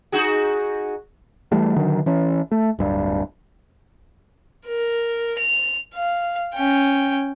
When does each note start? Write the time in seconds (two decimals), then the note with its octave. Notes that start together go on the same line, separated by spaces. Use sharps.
0.12 D#4 F#4 G#4
1.52 E3 G3 A3
1.76 D3 D#3 F#3
2.06 E3 C#4
2.51 A3
2.79 D1 G2
4.67 A#4
5.39 F7
5.95 F5
6.55 C#4 G5